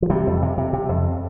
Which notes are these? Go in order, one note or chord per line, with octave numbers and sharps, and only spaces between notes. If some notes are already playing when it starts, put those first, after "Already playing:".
F3
C3 G3
F2
C3
C3
C3
F2